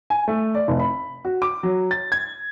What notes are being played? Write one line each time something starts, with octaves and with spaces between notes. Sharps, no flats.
G#5
A3
D5
F1
B5
F#4
D6
F#3
A6
G#6